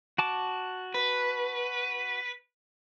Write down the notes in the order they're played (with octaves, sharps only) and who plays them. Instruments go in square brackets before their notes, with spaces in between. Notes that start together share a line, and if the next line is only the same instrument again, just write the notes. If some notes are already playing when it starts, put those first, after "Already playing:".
[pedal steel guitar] F#4 A5 D6
[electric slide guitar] B4